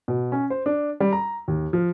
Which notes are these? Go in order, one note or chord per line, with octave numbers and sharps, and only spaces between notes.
B2
C#4
C5
D4
G3
A#5
D#2
F3